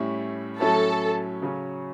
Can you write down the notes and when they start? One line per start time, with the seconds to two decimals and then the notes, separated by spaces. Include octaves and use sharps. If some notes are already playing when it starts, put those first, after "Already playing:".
Already playing: A2 G3 C#4 E4
0.60 A2 F#3 C#4 E4 A4
1.42 C#3 F#3 C#4